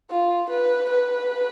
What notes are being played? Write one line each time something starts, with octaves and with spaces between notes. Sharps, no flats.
F4
B4
B4